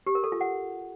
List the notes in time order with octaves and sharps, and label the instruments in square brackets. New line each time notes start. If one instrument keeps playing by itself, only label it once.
[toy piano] G4
A#4
A4
F4
F#5